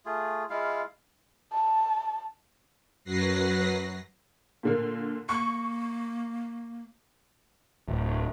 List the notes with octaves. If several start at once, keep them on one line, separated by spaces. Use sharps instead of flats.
A3 F4 G#4
G#3 E4 F4 F5
A5
F#2 F#3 B4 A#6 C7
A#2 D3 A#3
A#3 C#6
D1